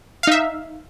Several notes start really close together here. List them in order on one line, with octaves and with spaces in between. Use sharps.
F5 D#4 E5